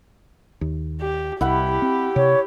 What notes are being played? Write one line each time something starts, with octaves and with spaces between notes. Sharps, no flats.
D#2
G4
C2 E4 G4 F#5 B5
C4
C3 C#5